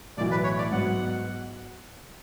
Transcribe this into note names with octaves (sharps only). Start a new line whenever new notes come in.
B1 A2 E3 D5
B4
C#5
D5
G#2 F#3 B3 F#5